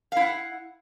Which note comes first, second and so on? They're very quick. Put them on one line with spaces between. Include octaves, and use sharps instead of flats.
F5 E4 F#5